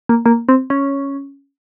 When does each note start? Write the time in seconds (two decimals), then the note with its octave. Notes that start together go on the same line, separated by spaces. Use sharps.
0.09 A#3
0.26 A#3
0.49 C4
0.70 C#4